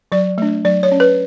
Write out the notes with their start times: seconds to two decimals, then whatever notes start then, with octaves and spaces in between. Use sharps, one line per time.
0.12 F#3 D5
0.38 A3 D4
0.64 F#3 D5
0.83 C#5
0.92 C#4
1.00 B4